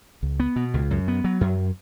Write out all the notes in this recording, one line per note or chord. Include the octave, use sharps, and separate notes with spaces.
C#2
B3
B2
C#2
F#2
B3
F#3
F#2